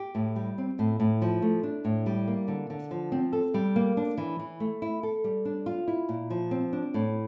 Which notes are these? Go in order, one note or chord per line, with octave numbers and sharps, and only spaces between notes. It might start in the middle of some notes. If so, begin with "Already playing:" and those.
Already playing: G4
A2
G3
C4
A2
A2
F3
A3
D4
A2
G3
A#3
D3
D3
F3
C4
A4
G3
A#3
D4
E3
E3
A3
E4
A4
G3
D4
F4
E4
A#2
F3
C4
D4
A2